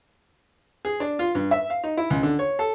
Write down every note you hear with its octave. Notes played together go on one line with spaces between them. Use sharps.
G#4
D4
F4
G2
E5
F5
D#4
E4
C#2
D3
C#5
A4